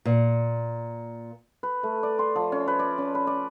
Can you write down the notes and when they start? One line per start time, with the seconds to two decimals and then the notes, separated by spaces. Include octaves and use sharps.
0.05 A#2
1.63 B4
1.83 A3
2.03 D5
2.19 C6
2.36 F3
2.52 C#4
2.68 B4
2.79 D5
2.98 C#4
3.15 B4
3.27 D5